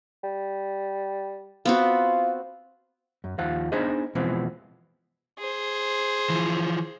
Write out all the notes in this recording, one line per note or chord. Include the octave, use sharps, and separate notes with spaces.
G3
B3 C4 F4 F#4
F#2
D#2 F3 F4 F#5
B3 D4 D#4 G#4 C5 D#5
B2 E3 F3 G#3 B3 C4
G#4 C5
E3 F3